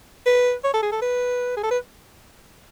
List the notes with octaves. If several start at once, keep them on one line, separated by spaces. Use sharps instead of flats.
B4
C#5
A4
G#4
A4
B4
G#4
A4
B4